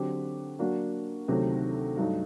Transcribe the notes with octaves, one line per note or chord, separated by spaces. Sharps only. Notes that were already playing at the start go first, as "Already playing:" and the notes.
Already playing: D3 F#3 C4 G4
F#3 A#3 D4 F#4
D2 C3 D#3 F#3 A3
G2 F#3 A3 D#4